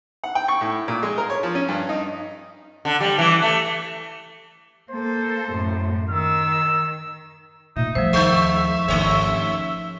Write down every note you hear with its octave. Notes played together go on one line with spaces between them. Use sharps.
F#5
G5
C#6
A2
A#2
G#3
A#4
C#5
F3
C#4
G2
D#4
D3
G3
E3
A3
A#3 A4 C5
F#2 A2
D#3 E6
A#2 D#4 E5
F3 G3 A3 C5 E5
D#2 G#3 D#4
G#1 D#2 D3 A3 C#5
C#4